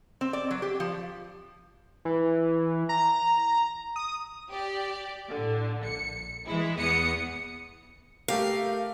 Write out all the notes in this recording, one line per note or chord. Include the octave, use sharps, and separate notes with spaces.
C4
D5
F#3
G4
F3
E3
A#5
D#6
G4 D5
A2 D3
A#1 C#7
E3 G#3 E4
E2 B3 D#6 C#7
A3 G4 A#4 F5